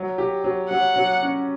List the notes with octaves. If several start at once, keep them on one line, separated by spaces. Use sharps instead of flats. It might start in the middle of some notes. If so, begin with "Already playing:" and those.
Already playing: F#3
G4
F#3
F#3 F#5
F#3
C#4